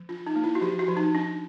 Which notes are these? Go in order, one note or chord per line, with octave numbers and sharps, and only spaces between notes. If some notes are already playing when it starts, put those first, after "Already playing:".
Already playing: F3
D4 F4
D#4
A#3
E4
F#4
F3 G4
F#4
F3
D#4
D4